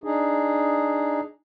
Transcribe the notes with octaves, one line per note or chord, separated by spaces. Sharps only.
D4 D#4 G#4